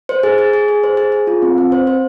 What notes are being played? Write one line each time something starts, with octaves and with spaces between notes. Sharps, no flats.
C5
G#4
G#4
G#4
G#4
C5
G#4
G#4
F4
C4
C4
C5
C5